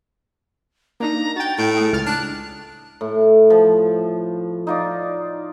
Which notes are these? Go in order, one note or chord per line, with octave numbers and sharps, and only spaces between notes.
A#3 D4 D#4 A#5
F#4 G5 A6
A2 D7
A3 G#4
C#2 F6 A6
D4 F#6
A2
F3
D#4 F4 D5